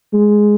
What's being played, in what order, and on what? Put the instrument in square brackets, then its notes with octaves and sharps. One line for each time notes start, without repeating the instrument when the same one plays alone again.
[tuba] G#3